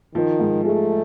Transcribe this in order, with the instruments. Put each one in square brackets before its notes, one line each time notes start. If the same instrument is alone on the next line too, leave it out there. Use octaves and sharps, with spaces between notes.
[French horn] D#3 [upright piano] F3
[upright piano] G#2
[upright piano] G#3 [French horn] A3